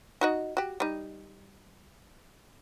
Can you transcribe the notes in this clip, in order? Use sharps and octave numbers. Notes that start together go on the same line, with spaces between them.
D#4 F#4 D#5
F#4 G4
G3 D#4